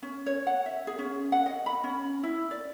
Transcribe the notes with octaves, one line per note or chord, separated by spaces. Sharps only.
C#4
C#5
F#5
E5
G#4
C#4
F#5
D#5
B5
C#4
E4
D5